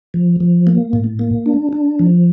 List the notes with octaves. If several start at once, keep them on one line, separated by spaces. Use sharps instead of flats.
F3
F3
A#3
A2
A#3
D4
D4
F3